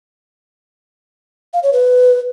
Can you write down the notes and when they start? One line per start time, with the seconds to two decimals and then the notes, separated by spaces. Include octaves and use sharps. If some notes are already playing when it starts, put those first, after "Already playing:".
1.53 F5
1.63 C#5
1.73 B4